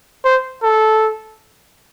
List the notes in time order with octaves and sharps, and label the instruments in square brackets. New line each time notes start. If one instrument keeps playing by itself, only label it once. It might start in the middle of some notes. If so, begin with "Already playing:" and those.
[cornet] C5
A4